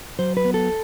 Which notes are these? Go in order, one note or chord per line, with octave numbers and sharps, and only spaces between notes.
F#3 C5
B4
B3
A4